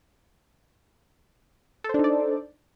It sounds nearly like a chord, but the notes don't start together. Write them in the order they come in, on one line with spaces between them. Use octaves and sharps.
A4 C5 D4 D#4 D5